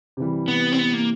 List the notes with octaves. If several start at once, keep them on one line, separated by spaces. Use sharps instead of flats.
C3 E3 G3
B3
C4
B3
A#3